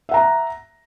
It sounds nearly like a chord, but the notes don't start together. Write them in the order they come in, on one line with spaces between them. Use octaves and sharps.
E5 F#5 A#5